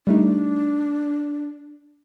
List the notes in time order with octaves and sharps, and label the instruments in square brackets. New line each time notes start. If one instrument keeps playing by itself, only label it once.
[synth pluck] G3 A3 D#4 [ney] D4